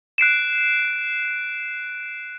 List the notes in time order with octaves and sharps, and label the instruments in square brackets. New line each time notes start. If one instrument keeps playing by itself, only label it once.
[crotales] F#6 C7 D7 E7